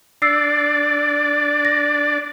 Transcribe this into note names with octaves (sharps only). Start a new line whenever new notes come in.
D4 D5 E6 C7
A#6